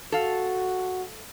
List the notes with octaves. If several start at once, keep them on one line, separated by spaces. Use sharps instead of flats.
F#4 A4 F5